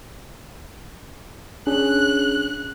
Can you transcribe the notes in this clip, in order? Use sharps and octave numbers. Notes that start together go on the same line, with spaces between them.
C#4 D4 G#4 F#6